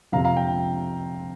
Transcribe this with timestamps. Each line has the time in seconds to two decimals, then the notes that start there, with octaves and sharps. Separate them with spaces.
0.12 F2 C3 F3 F5 A#5
0.25 F5 A#5
0.37 G5